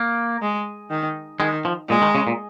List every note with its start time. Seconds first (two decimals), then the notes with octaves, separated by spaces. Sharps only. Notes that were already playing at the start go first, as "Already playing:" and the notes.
Already playing: A#3
0.42 G#3
0.90 D#3
1.40 D#3 G#3
1.65 F3
1.89 A#2 G#3
2.02 D#3
2.15 C#3
2.27 A#2